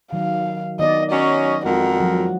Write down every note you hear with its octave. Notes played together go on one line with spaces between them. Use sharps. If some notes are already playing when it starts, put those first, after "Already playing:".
D#3 F#3 F5
D#3 B3 D5 D#5
F#3 C#4 D#5
F2 G#3 F#4 A#4
F3 F#3